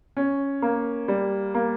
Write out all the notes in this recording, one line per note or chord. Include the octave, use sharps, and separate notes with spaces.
C#4
A#3
G3
A#3